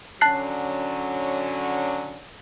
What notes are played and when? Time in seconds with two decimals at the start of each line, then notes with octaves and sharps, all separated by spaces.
0.21 D3 F#3 C#4 A5 F#6 C7